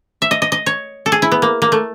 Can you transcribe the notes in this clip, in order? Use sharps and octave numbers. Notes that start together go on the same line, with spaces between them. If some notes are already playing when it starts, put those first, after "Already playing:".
E5
D#5
D#5
D#5
C#5
A4
G#4
E4
B3
A#3
A#3
A3